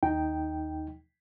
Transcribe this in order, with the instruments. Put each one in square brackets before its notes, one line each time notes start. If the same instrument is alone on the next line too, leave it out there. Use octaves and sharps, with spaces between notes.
[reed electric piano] D#2 D#4 G5